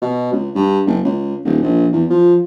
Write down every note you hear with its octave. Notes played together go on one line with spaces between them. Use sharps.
B2
C#2
G2
F#1
C#2
D#1
A#1
E2
F3